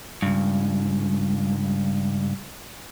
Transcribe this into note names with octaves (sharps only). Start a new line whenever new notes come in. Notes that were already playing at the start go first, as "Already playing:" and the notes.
C#2 G2